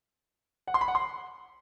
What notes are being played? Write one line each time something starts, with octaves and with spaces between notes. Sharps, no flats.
F#5
C6
B5
F#5
C6